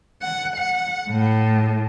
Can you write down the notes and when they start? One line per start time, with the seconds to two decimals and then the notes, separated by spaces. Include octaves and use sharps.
0.22 F#5
0.57 F#5
1.10 A2